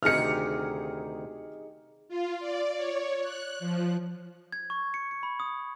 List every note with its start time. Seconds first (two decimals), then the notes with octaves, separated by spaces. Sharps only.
0.03 D2 C3 D#3 D#4 G4 G#4 F6 C#7
2.08 F4
2.39 D5
2.76 C#5
3.21 F#6
3.59 F3
4.52 G#6
4.70 C#6
4.94 C#7
5.11 C#7
5.23 B5
5.40 D#6